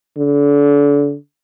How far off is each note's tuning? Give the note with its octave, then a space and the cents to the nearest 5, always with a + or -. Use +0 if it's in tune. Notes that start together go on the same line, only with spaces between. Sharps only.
D3 -35